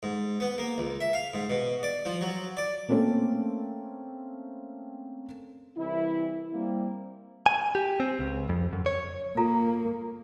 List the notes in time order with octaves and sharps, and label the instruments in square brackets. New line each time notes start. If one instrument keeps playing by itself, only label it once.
[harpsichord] G#2
B3
A#3
C#2
E5
F5
G#2
B2
D5
F3
F#3
D5
[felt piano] A3 A#3 C4 C#4 A4
[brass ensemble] C2 E3 E4
G3 A#3 C4
[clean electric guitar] G#5
G4
C4
C#2
F2
F#2
C#5
[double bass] A#3 [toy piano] F4 A4 A#5